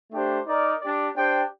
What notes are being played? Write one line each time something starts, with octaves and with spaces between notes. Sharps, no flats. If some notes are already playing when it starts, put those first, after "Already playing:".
A3 D4 G4 C5
D#4 A#4 D5
D4 G4 D5
D4 G4 C5 G5